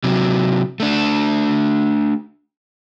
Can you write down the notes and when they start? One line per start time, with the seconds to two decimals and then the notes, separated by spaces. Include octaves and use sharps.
0.04 C3 F#3
0.80 A3 D4